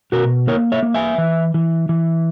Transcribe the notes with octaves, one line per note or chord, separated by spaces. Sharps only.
B2 F#4 A#4
A#3 A#4 C#5
C#5 E5
A#3
E5 G#5
E3
E3
E3